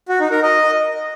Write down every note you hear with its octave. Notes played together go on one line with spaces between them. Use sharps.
F#4
D#4
A#4
D#5